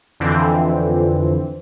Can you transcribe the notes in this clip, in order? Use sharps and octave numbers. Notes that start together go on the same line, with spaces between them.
F2 D3 E3 C4